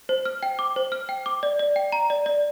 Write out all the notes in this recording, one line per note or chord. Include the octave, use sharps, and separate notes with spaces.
C5
F6
G5
D6
C5
F6
G5
D6
D5
D5
G5
A#5
D5
D5